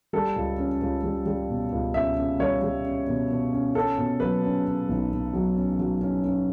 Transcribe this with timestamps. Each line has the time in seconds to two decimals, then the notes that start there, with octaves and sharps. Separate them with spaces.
0.13 G3 A4
0.36 C#2
0.58 C#4
0.82 C#2
1.04 G3
1.26 G3
1.49 B2
1.72 C#2
1.94 C#4 E5
2.17 C#4
2.39 G3 C#5
2.62 G3
2.84 C#4
3.08 B2
3.30 B2
3.52 C#4
3.75 C#4 A4
3.98 B2
4.20 F#3 B4
4.44 C#4
4.65 C#4
4.89 B1
5.11 B2
5.33 F#3
5.56 C#4
5.79 F#3
6.01 C#4
6.24 C#4